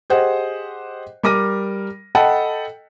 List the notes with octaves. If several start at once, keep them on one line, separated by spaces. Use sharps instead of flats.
G4 G#4 C5 D#5 F#5
G3 A#4 D6 A#6 D#7
A4 D#5 F#5 G5 A5 B5